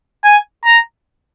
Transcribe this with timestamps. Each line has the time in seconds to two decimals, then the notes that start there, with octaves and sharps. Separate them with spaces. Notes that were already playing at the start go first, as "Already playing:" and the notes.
0.24 G#5
0.65 A#5